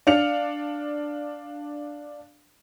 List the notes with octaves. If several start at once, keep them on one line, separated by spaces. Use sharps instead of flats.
D4 F5 C#7 F7